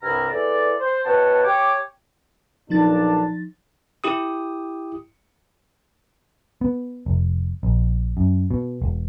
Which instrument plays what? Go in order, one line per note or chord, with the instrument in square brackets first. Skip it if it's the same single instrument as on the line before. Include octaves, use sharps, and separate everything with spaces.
[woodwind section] C2 G2 C3 E4 A#5 F6
E2 E3 A4 D5
C5
B2 B3 C#5 F#5 G5 A5
G4 C#5 D6
[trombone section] B1 A#2 D4 [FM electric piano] F3 D#4 A6
[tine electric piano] E4 G4 D#6
[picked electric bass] B3
F1
A#1
F#2
B2
E1